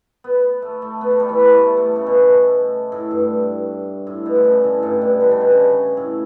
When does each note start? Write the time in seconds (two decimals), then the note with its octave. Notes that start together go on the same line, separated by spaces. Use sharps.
0.24 B3
0.62 A3
0.82 A3
1.01 B3
1.11 A3
1.20 G3
1.29 E3
1.39 B3
1.58 A3
1.77 A3
1.96 C#3
2.07 B2
2.92 A2
3.11 G2
4.07 A2
4.26 B2
4.35 D3
4.44 C#3
4.64 A2
4.83 G2
5.02 B2
5.21 D3
5.31 C#3
5.41 B2
5.51 C#3
5.97 A2